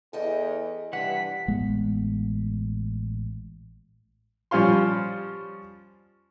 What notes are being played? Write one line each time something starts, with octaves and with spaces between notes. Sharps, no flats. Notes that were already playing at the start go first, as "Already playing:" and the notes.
E2 A4 D#5 G5
G2 C3 E3 F#5 B6
A1 G#3 B3
F3 G3 C#4 F5 C6